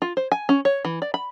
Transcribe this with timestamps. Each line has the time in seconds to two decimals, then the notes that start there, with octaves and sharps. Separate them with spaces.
0.02 F4
0.17 C5
0.32 G#5
0.49 C#4
0.65 C#5
0.85 E3
1.02 D5
1.14 B5